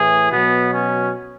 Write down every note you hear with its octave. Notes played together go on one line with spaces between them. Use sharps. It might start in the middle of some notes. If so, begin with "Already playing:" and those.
Already playing: A2 E3 G#4
B2 F#3 B3
C#4